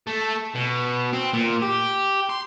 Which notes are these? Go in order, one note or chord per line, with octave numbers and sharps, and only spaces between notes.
A3
B2
C4
A#2
G4
C6